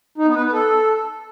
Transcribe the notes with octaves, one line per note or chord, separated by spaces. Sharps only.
D#4
B3
B4
B3
A4